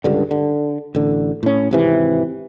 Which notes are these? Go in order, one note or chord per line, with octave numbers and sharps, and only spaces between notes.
C#2 G2 D3
D3
A1 D3
A2 C#4
G#1 C3 E3